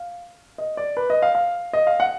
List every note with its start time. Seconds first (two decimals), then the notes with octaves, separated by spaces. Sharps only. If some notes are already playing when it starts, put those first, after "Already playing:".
Already playing: F5
0.58 D#5
0.77 D5
0.97 B4
1.10 D#5
1.22 F5
1.35 F5
1.73 D#5
1.87 F5
2.00 F#5